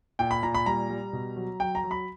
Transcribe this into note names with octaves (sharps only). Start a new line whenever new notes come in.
A#2 G5
B5
A#2 A#5
B5
G3 A#5
G3
B2
F#3
F#3 G5
A#5
F#3
B5